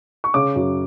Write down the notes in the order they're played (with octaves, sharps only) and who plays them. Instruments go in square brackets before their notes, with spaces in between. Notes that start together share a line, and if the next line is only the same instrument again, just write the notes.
[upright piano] C#6
C#3 D6
F#2